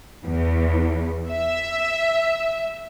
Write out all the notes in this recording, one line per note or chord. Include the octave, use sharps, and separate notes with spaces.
E2
E5